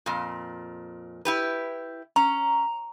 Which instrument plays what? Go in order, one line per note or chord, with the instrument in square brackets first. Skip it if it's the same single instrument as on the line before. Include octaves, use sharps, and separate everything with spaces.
[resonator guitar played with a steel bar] F2 A#2
E4 G4 B4
[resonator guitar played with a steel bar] C#4 [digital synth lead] A#5